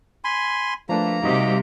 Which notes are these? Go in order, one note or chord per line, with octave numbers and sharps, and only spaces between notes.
G#5 B5 C6
F3 A3 A#3 D4 B4 A#5
C3 G3 D#4 F#4 G4 D#5